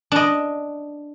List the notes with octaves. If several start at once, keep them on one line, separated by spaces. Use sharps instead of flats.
D4 D#5